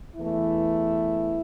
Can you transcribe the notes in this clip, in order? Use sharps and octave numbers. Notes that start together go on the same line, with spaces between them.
E2 E3 A3 E4